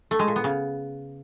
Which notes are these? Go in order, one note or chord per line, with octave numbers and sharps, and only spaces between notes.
A3
G#3
A#2
B3
C#3